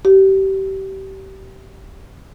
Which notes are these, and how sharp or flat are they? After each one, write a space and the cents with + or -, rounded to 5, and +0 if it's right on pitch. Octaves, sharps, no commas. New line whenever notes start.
G4 -25